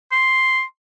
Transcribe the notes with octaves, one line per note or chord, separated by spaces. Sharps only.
C6